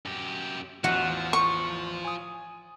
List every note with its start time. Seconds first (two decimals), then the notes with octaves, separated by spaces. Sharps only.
0.06 F#2 G4
0.84 A1 E2 F3 F#4
1.33 C#6
2.05 G#5 D#6